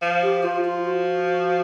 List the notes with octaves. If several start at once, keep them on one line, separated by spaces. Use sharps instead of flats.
F3
G4
F3 F4
F4
F#4